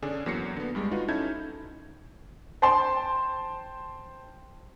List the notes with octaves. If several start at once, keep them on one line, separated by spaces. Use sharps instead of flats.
D3 C#4 D4 G#4
E2 F#3 A#3 A#6 C7 C#7
D3 B3
G2 G3 G#3
D#4 F4 F#4 B4
C#4 D#4 E4 A4 G6 G#6
C5 G5 A5 C6